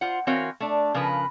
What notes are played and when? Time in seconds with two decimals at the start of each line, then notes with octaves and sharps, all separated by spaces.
0.01 F4 C5 F#5
0.27 E3 C4 F#4 A#4 C#5 F5
0.60 A3 D4
0.94 C#3 F3 A#4 B4